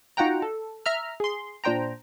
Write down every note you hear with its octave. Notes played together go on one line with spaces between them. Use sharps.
D#4 F4 F#4 F#5 G5 A#5
A4
E5 A#5 F6
G#4 C6
A#2 D4 C5 G5 A#5